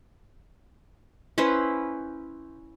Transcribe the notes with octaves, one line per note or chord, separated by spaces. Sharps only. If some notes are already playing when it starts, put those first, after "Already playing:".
C#4 E4 B4 C5